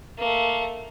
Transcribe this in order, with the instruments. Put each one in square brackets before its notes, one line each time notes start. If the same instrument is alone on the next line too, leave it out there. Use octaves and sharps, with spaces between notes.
[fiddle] A3 A#3